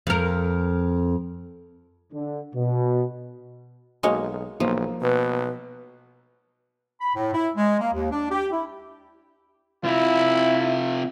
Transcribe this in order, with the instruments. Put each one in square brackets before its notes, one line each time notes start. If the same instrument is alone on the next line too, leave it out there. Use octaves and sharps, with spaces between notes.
[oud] F2 A#4
[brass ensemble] D3
B2
[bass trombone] B1 [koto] G#3 A#3 C#5 [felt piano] F#4
[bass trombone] B1 [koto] F3 [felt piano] A#3
[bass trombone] B2 [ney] B4
[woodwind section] B5
A2
E4
G#3
A#3
D#2
D4
G4
E4
[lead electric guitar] C3 F4 [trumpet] E4